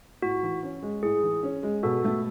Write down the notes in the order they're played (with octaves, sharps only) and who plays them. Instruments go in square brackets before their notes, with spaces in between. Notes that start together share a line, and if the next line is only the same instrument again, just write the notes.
[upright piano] A2 [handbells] F#4
[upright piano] E3
C#4
G#3
[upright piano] A2 [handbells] G#4
[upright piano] E3
C#4
G#3
[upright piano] B2 [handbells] F#4 A4
[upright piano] A3